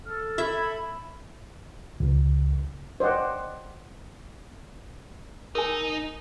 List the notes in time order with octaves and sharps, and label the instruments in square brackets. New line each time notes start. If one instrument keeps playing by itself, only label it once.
[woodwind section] A4 [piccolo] F6
[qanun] E5 [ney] B5 [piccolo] G#6
[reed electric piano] C#2
[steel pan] C5 D5 D#5 F#5 G5
[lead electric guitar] D#4 [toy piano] A#4 G#5